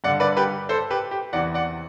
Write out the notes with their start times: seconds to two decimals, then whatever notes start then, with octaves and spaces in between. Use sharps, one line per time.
0.04 G2 D5 F#5
0.08 D3
0.20 B4 D5
0.37 G4 B4
0.69 A4 C5
0.90 G4 B4
1.11 G4
1.33 E2 C3 E3 D5 F#5
1.54 D5 F#5